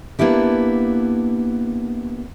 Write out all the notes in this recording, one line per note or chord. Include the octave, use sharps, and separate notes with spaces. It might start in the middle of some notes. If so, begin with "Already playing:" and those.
A#3 B3 D4 E4 G4